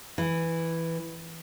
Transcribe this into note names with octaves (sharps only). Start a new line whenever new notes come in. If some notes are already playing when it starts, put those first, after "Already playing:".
E3